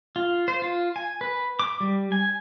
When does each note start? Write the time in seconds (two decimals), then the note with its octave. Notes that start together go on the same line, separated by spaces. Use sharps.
0.16 F4
0.48 C5
0.62 F4
0.96 G#5
1.21 B4
1.59 D6
1.80 G3
2.12 G#5